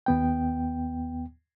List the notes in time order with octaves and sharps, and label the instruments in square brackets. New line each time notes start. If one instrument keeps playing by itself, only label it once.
[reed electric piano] D#2 B3 G5